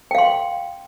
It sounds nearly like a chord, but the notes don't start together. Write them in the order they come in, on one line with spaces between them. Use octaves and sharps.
G5 F5 C6